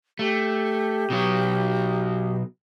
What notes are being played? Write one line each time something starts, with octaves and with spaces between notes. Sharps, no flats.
A3 G4
B2 F#3